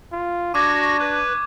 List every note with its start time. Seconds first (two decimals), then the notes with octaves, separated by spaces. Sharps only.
0.12 F4
0.54 D4 F#4 C#6 D6 G#6 A#6
0.99 B4